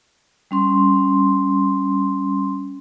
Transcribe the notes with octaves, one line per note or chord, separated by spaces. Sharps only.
G3 C#4 C6